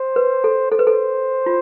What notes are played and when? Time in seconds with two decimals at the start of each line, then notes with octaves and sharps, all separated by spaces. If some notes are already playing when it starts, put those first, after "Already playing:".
Already playing: C5
0.16 B4
0.44 A4
0.71 A4 C5
0.79 B4
0.87 A4
1.46 F4